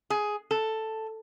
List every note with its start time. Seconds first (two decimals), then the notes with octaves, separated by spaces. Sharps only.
0.10 G#4
0.51 A4